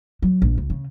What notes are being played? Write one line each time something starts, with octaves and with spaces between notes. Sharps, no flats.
F#3
A#1
C#2
C#3